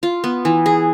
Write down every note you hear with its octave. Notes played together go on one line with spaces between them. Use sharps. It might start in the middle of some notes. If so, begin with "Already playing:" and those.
F4
B3
E3
G#4